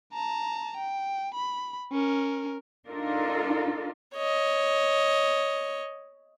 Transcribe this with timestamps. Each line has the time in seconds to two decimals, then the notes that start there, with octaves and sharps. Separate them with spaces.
0.13 A5 A#5
0.77 G5
1.34 B5
1.92 C#4 A#4
2.88 D4 D#4 F4 A4 A#4
4.15 C#5 D#5